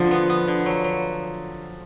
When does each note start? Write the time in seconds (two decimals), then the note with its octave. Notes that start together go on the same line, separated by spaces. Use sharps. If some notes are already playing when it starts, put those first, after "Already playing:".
Already playing: D3 F3
0.11 B3
0.29 B3
0.48 D3
0.66 F#3
0.84 F#3